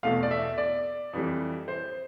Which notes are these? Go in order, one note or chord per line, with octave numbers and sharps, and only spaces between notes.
E2 B2 A3 F5
D5
E5
D5
F2 E3 G3
C5